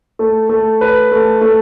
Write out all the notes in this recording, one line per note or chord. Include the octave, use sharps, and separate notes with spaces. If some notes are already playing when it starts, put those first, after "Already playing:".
A3
A3
B4
A3
A3